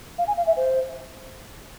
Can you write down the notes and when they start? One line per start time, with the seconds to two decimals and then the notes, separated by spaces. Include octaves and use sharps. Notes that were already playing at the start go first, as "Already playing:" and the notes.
0.18 F5
0.27 G#5
0.37 F5
0.46 E5
0.56 C5